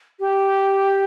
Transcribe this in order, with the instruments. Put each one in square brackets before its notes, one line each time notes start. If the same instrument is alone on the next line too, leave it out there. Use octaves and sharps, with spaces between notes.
[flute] G4